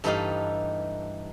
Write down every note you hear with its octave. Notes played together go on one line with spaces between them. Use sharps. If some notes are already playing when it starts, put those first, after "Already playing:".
G2 E3 A3 D#4 G4 F5